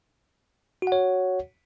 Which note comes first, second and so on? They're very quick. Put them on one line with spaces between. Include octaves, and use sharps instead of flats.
F#4 F#5 C#5